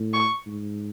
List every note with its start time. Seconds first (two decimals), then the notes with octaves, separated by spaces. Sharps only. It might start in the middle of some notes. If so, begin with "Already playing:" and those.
Already playing: A2
0.14 C#6
0.46 G#2